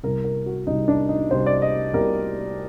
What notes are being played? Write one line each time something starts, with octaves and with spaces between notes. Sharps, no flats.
C2 C3 G3 A#4
A#4
F#4
C2 C3 G3 D#4
D4
D#4
C2 C3 G3 C5
D5
D#5
C2 C3 G3 A#4